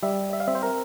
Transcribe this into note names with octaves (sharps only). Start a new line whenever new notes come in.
G3 E5
E5
F5
C4 E5
C5
A#4